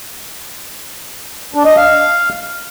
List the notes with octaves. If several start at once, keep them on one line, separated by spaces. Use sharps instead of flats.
D4
D#5
F5